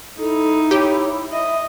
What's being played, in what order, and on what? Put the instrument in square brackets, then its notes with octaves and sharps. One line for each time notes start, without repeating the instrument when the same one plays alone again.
[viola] D#4 [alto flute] E4 [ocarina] A4
[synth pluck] G4 [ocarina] C#5
[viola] D#5 [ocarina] E5